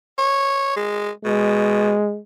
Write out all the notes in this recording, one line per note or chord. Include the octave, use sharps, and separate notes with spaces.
C#5
G#3
B2 G#3